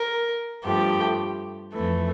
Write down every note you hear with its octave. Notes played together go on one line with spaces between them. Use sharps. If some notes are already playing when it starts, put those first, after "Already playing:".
Already playing: A#4
G2 F3 A3 G4
F2 E3 A3